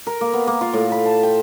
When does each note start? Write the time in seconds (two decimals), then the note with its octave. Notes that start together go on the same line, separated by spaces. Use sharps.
0.07 A#4
0.21 A#3
0.33 B3
0.47 A#3
0.61 F4
0.73 A2
0.92 B5
1.06 A5
1.23 G5